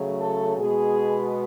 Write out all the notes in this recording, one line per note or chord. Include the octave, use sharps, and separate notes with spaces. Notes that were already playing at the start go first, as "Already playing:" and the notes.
Already playing: C#3 F#3 A3
A4
B2 G#3 B3 G#4